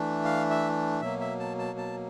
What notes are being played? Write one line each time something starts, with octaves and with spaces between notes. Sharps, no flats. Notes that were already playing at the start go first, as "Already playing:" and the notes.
Already playing: E3 A3 D4
F5
E5
B2 F#3 A#3 E5
E5
A5
A5
A5